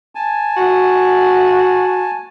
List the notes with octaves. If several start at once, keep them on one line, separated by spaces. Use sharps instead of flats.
G#5 A5
F#4